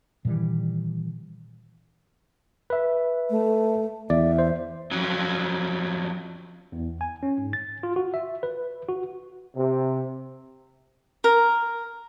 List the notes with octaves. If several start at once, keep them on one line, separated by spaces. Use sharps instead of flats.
A#2 D#3 E3 G3
B4 E5
A3
E2 D5 E5
C5
F2 F#3
E2
G#5
C#4
G#2
A6
F4
F#4
E5
B4
F#4
C3
A#4